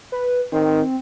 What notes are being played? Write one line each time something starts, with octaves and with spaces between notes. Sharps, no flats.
B4
D#3 C4